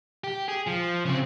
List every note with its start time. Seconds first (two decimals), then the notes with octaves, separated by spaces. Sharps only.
0.24 G4
0.48 G#4
0.67 F3
1.05 C#3 C4